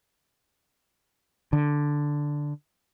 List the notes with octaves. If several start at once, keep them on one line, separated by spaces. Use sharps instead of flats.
D3